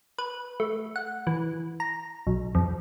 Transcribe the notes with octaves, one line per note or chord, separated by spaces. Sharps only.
B4
A3
F#5
E3
A#5
B1
F2